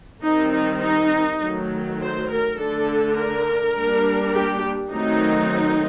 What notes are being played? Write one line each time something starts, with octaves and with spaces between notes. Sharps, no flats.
D#3 G3 C4 D#4
D#4
D#4
D#3 F#3 A3
C5
A#4
D3 A3 D4 A4
A#4
G3 A#3 D4
G4
D#3 F#3 A3 C4 D#4